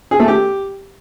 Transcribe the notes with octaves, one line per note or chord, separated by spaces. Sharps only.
G#4
A3
G4